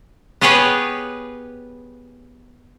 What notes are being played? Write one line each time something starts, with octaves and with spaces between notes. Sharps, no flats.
B3 G4 G#4 B4 C#5